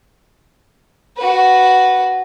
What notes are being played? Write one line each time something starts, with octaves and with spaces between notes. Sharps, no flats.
F#4 B4